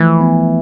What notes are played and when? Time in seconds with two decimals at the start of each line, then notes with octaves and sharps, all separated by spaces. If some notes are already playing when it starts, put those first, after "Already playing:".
Already playing: E3 F3 A3
0.21 B3